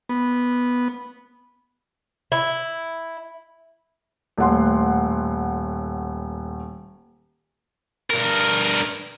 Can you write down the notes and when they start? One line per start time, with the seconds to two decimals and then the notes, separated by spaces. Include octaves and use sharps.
0.09 B3
2.32 E4
4.37 D#1 A2 F#5 C6
8.10 G2 A#4